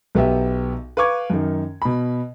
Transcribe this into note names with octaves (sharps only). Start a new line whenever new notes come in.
B1 B3 G4 E5
B4 F5 C#6 D6 G#6
F#2 D#3
B2 B5